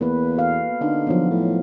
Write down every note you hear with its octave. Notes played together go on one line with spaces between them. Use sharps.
E2 A#3 B3 B4
F#4 A4 F5
D3 D#4 F5
F3 F#3 B3
A2